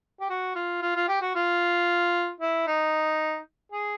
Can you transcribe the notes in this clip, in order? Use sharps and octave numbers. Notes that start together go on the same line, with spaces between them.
G4
F#4
F4
F4
F4
G4
F#4
F4
E4
D#4
G#4